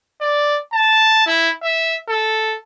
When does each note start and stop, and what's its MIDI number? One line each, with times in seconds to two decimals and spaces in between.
0.21 0.58 74
0.73 1.26 81
1.27 1.50 64
1.63 1.97 76
2.09 2.57 69